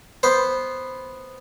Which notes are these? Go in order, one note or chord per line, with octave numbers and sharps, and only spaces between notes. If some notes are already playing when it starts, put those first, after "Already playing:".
B3 C5